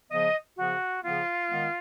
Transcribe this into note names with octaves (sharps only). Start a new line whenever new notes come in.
C#3 F3 B3 D#5
C#3 F3 B3 F#4
C#3 F3 B3 F4
D#3 G#3 B3